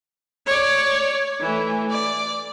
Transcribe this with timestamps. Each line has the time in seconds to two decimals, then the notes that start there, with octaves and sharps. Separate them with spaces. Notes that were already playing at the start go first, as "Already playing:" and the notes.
0.46 C#5 D5
1.41 E3 A3
1.90 D5